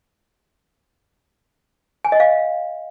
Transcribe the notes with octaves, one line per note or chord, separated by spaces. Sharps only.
G#5
D#5
F5